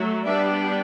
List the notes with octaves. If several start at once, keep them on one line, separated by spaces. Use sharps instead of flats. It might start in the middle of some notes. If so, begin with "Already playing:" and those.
Already playing: F#3 A3
G3 B3 D4 E5